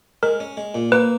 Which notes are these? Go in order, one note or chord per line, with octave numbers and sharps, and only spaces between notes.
G#3 A#4
C#4
G#3
A#2
A#3 B4